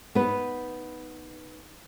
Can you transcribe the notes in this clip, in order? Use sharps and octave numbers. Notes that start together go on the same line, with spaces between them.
B3 D#4 B4